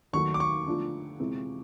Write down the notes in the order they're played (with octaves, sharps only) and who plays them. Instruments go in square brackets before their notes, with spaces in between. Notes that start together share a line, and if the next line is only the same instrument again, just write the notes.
[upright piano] D#2 D#3 F#3 A3 [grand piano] C#6
[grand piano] D6
C#6
[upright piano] D3 F3 A3 D4 F4
C3 E3 G#3 C4 E4